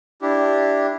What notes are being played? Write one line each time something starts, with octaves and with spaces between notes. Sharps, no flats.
D4 E4 G4